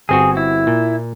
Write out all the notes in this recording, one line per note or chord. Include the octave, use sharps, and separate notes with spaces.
G1 C4 F#4 G#4
E4
A#2